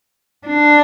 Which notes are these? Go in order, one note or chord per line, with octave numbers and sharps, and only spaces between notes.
D4